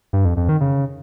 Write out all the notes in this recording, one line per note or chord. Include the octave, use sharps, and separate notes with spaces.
G2
F2
F2
D#3
C#3